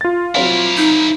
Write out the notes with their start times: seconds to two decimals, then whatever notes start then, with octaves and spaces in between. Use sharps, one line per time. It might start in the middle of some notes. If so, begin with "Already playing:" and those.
0.01 F4 A6
0.35 F#3 C4 E4 A#4 F5
0.77 D#4